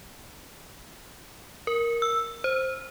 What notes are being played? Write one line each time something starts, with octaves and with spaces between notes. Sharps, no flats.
A#4
E6
C5